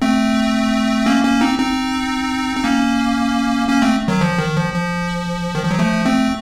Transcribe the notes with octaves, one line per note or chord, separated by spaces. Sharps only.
A3 C4
A#3 C#4
A#3 C#4
C4 D#4
C4 D#4
C4
A#3 C#4
A#3 C#4
A3 C4
D#3 F#3
F3
D#3
F3
F3
D#3
F3
F#3
F3 A3
A3 C4